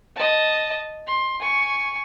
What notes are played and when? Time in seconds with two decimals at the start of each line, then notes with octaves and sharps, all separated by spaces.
0.16 D#5 A5
1.07 C6
1.40 G#5 C#6